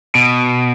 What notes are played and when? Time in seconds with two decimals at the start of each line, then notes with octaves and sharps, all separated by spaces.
0.15 B2